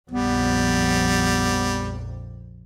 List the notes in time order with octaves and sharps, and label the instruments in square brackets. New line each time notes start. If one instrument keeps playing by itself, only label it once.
[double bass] A#1 F2 [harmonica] G3 [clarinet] B3